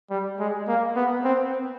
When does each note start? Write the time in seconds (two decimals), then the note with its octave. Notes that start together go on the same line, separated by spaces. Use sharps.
0.11 G3
0.39 G#3
0.68 A#3
0.96 B3
1.24 C4